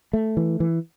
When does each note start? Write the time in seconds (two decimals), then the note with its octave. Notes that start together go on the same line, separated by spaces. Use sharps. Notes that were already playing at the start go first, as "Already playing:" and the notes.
0.13 A3
0.37 E3
0.60 E3